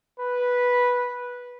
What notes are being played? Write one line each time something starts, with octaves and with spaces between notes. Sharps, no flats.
B4